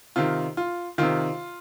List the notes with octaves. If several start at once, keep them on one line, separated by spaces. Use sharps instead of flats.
C3 D#3 F4
F4
C3 D#3 F4